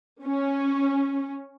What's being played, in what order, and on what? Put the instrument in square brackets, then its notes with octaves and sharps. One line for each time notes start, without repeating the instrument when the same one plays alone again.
[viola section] C#4